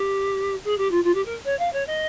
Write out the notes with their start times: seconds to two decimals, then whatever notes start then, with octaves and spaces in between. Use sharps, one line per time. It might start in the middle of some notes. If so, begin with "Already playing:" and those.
Already playing: G4
0.64 G#4
0.78 G4
0.91 F4
1.04 F4
1.14 G4
1.25 A#4
1.45 C#5
1.59 F5
1.73 C#5
1.87 D#5